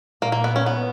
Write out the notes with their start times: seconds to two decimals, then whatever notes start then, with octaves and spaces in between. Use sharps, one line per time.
0.22 A#2 A#3
0.32 A#3
0.44 B3
0.56 C#4
0.66 B3